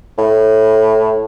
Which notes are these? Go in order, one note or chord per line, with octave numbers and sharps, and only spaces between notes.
A2